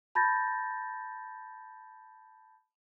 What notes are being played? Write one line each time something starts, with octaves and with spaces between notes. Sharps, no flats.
A5 B5 G6 A6 A#6